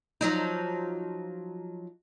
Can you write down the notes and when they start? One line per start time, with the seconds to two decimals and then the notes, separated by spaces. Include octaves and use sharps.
0.21 F3 F#3 D#4